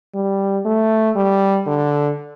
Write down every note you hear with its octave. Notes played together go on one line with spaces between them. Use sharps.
G3
A3
G3
D3